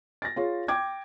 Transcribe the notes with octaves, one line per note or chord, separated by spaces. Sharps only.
A6 A#6
F4 G#4 C#5
G5 D6 G#6